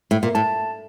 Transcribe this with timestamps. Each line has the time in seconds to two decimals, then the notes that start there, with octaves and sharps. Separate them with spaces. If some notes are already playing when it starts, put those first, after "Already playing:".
0.11 A2
0.23 A#2
0.35 A2 A5